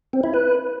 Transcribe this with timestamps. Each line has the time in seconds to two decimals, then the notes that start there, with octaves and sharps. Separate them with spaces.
0.13 C4
0.23 E4
0.34 B4